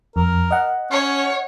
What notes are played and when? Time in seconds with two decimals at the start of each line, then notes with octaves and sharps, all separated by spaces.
0.16 F2 A#4
0.51 D#5 F#5
0.91 C#4 C#5